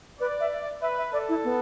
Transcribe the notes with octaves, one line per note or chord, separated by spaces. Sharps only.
B4 D5
E5
B4 E5
E5
A4 D5
E4
B3